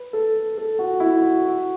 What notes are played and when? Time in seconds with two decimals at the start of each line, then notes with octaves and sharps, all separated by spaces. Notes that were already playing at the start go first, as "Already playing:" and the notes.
Already playing: B4
0.13 A4
0.57 A4
0.79 F#4
1.00 E4
1.22 F#4
1.44 F#4